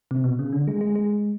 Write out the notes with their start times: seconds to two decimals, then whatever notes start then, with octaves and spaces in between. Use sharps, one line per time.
0.11 C3
0.24 B2
0.39 C#3
0.53 D3
0.67 G#3
0.81 G#3
0.95 G#3